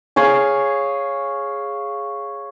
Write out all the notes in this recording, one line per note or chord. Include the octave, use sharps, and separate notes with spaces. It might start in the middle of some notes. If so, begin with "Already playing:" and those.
G#4 C#5 F5 G#5